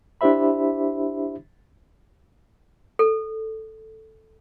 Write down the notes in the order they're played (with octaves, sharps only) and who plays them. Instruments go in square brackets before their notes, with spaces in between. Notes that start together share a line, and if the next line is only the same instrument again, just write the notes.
[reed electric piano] D4 E4 G4 C5 E5 B5
[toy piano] A4